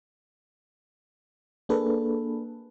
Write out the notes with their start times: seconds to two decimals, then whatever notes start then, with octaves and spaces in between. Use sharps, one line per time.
1.69 A#3 D4 G#4 A4 B4